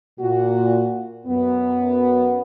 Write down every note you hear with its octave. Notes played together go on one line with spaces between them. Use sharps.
A#2 F#4
F#2 B3